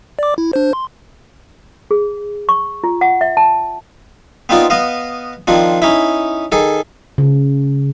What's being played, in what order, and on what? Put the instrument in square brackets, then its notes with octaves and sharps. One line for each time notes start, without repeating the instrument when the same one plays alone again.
[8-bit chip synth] D5 D6
E4
D4 C5
C6
[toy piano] G#4
C#6
F4
F#5
E5
A5
[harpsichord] B3 C4 D#4 F4 D5
B3 D#5 F5
D#3 F3 C4 D4
C#4 D#4 E4
D#3 G#4 A4
[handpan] C#3